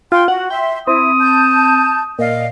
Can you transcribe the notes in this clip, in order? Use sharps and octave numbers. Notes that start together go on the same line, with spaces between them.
F4 G5 C6
F#4 F#5
E5 G5 C6
C4 E4 D#6
A5 G6
A#2 D5 D#5 F5